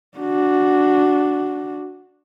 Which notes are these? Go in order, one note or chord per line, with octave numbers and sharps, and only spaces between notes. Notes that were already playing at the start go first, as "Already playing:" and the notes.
D4 F#4